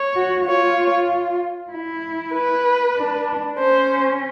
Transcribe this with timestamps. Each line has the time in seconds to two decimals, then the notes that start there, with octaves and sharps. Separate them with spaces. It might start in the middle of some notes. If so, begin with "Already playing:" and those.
Already playing: C#5
0.16 F#4
0.47 F4 C#5
1.72 E4
2.33 B4
2.96 D4
3.57 C#4 C5